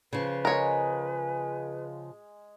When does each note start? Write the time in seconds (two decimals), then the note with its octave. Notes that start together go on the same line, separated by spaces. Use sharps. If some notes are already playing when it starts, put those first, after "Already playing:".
0.13 C#3 F3 B4
0.45 G#3 G#4 A#4 C#5